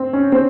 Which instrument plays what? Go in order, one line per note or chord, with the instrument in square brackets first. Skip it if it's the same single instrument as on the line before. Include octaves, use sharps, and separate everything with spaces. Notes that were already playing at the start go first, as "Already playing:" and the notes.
Already playing: [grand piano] C4
C#4
C4